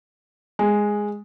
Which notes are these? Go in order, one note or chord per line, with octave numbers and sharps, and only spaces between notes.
G#3